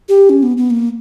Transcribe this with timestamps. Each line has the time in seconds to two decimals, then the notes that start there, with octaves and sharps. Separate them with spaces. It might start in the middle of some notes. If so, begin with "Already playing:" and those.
0.09 G4
0.30 C#4
0.43 B3
0.57 B3
0.70 A#3